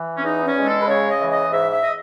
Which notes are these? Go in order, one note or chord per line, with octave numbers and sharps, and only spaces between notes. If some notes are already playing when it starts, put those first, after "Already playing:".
Already playing: E3
C#4
E2 D#4
C#4
G#3
A4
B4
C#3 C#5
D#5
E3
D#5
G#2 E5
E5
D#5